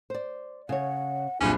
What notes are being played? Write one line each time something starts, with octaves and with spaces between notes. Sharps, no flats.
C5 D5
C#3 C#5 F#5
F#1 C2 A#2 C#4 D4